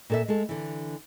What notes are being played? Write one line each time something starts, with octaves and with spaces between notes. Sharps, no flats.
A#2 A4 E5
G#3 A4
D3 E3